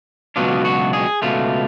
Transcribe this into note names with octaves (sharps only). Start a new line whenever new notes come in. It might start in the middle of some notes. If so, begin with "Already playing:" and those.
C#2 B2 F#3 B3 D4 F4
F#4
G#4
C#2 B2 A3 F4